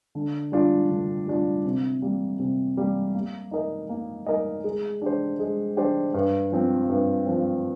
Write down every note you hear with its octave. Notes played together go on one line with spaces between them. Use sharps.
D3
G3 D4 F4
D3
G3 D4 F4
C3
G3 A#3
C3
G3 A#3
A#3
D#4 A#4 D#5
A#3
D#4 A#4 D#5
G#3
D4 G4 C5
G#3
D4 G4 C5
G2
F3 C4
G2
F3 C4